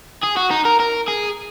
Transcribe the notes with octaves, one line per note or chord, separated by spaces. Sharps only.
G#4
F#4
D#4
A#4
A#4
G#4